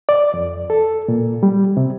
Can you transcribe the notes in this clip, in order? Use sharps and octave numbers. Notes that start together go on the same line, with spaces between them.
D5
F2
A4
A#2
G3
C3